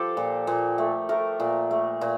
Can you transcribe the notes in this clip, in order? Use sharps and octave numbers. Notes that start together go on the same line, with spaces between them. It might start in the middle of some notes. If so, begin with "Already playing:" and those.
Already playing: F3 G4 A4
A#2
A#2
A3
A3 A#4
A#2
A3
A#2